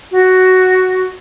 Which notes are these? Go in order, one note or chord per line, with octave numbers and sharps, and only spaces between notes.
F#4